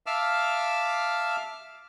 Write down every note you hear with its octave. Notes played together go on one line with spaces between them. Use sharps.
E5 F5 A5 D6 E6 F6